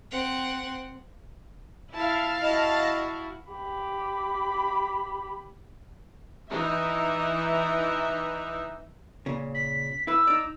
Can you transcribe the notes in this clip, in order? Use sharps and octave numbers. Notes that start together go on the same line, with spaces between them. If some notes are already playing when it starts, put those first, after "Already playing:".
C4 F#5
E4 F5 A5
E4 F#4 D#5
G4 B5
E3 D#4 E5
A#2 C#3
B6
E4 B4 E6
D#4 D5